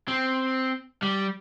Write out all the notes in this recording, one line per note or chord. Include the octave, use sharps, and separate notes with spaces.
C4
G3